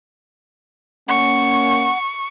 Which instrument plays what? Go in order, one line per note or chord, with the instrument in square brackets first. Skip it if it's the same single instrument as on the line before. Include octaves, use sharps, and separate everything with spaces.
[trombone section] A#3 C#4 [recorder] F#5 [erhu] C#6